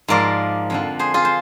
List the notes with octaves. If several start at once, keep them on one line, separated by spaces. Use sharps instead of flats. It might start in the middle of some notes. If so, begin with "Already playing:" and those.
G#2 F3 A#4 D5
F2 D3 F3
G#4 C5
F4 G#4
C5